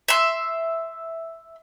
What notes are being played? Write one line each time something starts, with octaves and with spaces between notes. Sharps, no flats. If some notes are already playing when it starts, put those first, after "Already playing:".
E5 C6